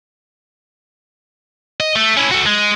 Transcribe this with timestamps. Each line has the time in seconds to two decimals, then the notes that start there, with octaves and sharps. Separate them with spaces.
1.80 D#5
1.96 A3
2.17 C#4 E4
2.31 F#4 A4
2.46 G#3